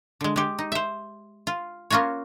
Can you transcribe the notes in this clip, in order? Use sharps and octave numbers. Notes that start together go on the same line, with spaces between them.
D3 G#3
G#3 G4
D#4
C5 E5
F4
A#3 C#4 F4 F#4 C#5